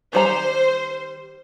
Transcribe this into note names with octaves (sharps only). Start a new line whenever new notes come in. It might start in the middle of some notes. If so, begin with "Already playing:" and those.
D#3 G3 C5 A#5